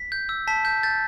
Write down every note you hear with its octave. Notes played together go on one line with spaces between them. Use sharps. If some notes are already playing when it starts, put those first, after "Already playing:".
Already playing: B6
G6
E6
A5 B6
G6
G6 A6